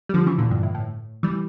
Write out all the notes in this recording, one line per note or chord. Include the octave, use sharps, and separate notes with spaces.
G3
D3 F3
C#3 E3
A#2 D3
G2
A2
A2
E3 G3